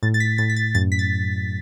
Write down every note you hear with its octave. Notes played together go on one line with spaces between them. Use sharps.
A2 A6
A6
B6
A2 A6
B6
A6
F#2 A6
B6
A6